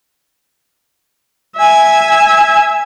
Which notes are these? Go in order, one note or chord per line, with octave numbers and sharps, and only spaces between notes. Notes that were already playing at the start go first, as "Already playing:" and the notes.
E5 G#5